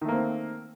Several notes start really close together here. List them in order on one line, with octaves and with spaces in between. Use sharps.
D#3 A3 A#3 C4